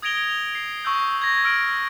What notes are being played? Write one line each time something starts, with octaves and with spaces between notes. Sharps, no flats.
D#6 G#6 A#6 D7 F7 G7
C7
C#6 E6 G6
C#6 G#6 A#6
E6 F6 D7